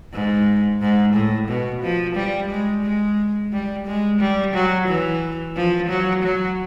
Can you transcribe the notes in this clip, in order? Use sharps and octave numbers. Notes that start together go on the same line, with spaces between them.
G#2
G#2
A2
B2
F3
G3
G#3
G#3
G3
G#3
G3
F#3
E3
F3
F#3
F#3